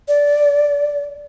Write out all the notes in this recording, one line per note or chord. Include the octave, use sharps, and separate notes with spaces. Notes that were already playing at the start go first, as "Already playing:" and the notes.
D5